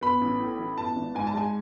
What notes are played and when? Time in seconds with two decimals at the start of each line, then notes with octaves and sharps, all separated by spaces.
0.01 B3 B5
0.21 A1
0.40 A2
0.58 E3
0.77 B3 A5
0.96 G#1
1.15 G#2 G#5
1.27 A5
1.34 G#3 G#5